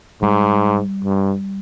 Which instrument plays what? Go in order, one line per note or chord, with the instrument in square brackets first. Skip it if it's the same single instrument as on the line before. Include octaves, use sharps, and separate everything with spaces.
[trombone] G#2 [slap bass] G3
[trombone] G2